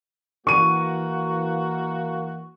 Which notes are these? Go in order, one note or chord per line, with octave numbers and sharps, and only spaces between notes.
E3 A#3 F#4 C#6 D#7